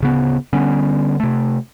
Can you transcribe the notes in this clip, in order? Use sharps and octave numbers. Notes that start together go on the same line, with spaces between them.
D1 C#3 B3
D3 G3 B3 C#4
C3 A3